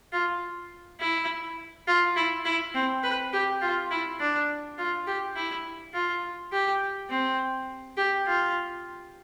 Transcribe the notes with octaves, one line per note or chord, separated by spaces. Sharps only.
F4
E4
F4
E4
E4
C4
B4
G4
F4
E4
D4
F4
G4
E4
F4
G4
C4
G4
F4